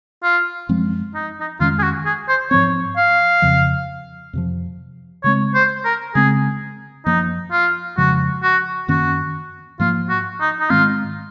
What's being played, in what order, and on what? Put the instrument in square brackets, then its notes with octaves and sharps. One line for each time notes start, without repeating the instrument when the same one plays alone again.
[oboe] F4
[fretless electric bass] F#2 F3 G#3 C4
[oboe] D#4
D#4
[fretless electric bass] F2 D#3 G#3 C#4 [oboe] F4
[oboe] G#4
F#4
G#4
C5
[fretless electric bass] G#2 F3 C4 [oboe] C#5
[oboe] F5
[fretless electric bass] F2 C#3 F3
F2 C3 F3
[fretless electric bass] C#3 G#3 C4 [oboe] C#5
[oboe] C5
A#4
[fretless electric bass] C#3 G#3 C4 [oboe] G#4
[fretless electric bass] F#2 F3 A#3 [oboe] D#4
[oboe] F4
[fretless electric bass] F2 C#3 F3 G#3 [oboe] F#4
[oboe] F#4
[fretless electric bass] F#2 D#3 A#3 C#4 [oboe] F#4
[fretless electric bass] G#2 F3 A#3 [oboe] F4
[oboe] F#4
D#4
D#4
[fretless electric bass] G#2 D#3 G#3 C4 [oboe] F4